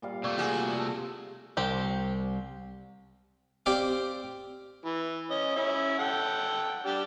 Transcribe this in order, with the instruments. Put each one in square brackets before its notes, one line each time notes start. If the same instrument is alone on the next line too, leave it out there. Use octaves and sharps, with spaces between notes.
[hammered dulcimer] A#2 G3 F5
[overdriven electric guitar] C3 A3 [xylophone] D5 C#6 D6
[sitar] F4 F#4 G#4
[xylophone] G4 A5
[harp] C2 [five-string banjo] C4 G4
[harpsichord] C4 G4 D5 F5
[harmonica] E3
C#4 D#5
C#4 E4
A4 F#5 G5
D4 G4